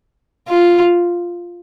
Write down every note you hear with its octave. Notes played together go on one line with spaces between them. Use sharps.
F4